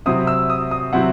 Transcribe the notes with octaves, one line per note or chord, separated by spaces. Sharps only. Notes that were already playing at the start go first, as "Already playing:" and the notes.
C3 F#3 C4 E4 D#6
E6
D#6
D#6
C3 F#3 C4 E4 F#5